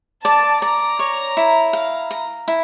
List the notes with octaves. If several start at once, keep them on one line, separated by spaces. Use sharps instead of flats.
D5 A5
D5 A#5
C#5
E4
F5
A#5
E4